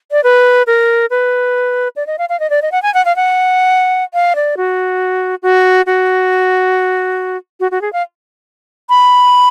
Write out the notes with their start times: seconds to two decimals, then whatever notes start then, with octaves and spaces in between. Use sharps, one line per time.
0.12 D5
0.24 B4
0.67 A#4
1.10 B4
1.96 D5
2.07 D#5
2.18 F5
2.29 F5
2.40 D#5
2.50 D5
2.62 D#5
2.72 F#5
2.83 G#5
2.94 F#5
3.05 F5
3.16 F#5
4.14 F5
4.35 D5
4.57 F#4
5.43 F#4
5.86 F#4
7.60 F#4
7.71 F#4
7.82 G#4
7.93 F5
8.89 B5